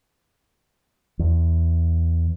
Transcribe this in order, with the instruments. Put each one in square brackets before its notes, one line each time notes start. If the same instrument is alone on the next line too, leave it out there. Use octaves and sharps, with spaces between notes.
[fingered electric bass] E2